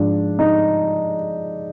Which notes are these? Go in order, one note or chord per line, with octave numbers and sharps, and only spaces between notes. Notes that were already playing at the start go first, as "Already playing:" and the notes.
Already playing: G#2 F3 D4
D#4